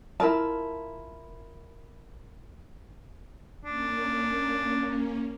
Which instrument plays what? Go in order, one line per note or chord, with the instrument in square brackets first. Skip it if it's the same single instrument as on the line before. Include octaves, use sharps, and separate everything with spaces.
[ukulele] E4 F4 A#4 A5
[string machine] A#3 C#4 [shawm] D4